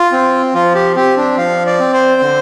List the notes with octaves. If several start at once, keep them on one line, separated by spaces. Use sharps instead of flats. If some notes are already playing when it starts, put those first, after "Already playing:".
Already playing: F4
C4
F3 F4
G4
C4 G4
D4
F3 F5
D5
C4
C5
D3